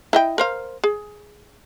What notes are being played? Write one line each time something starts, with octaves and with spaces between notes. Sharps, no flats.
E4 D#5 G5
A#4 C5 F5
G#4